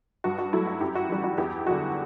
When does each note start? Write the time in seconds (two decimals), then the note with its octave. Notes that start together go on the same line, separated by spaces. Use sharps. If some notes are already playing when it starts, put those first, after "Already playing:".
0.24 G2 F#4
0.38 F#4
0.53 F#3 A3 E4
0.67 F#4
0.81 F#2 E4 G4
0.95 F#4
1.09 E3 G3 E4
1.24 F#4
1.38 E2 E4 G4
1.66 D3 F#3 F#4